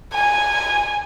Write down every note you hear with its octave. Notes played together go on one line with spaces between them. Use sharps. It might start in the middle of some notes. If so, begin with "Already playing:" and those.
G#5